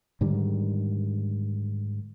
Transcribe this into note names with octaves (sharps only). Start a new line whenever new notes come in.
G#2 D3 D#3 G3